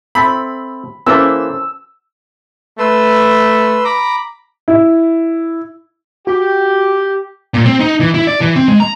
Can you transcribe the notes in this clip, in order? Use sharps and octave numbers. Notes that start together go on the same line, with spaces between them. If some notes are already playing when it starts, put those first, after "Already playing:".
C4 A4 E5 B5
E3 A#3 C#4 A4 C5 E5 E6
A3 B4 C6 E6
A#5 B5 D6
E4
F#4 G4
A#2
C4
D#4
E3
E4
D5
E3
C4
G#3
A#5